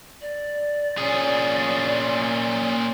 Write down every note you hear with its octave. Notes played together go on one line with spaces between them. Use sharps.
D5
A#2 C#4 G#4